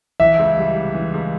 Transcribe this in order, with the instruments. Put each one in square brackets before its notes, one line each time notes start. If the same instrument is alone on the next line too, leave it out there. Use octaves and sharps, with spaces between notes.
[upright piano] E3 [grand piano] E5
[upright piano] C#2
G3
C3
E3
C#2